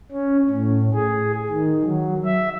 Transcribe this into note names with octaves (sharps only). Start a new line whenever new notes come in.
C#4
A2
G#4
D#3
F#3
E5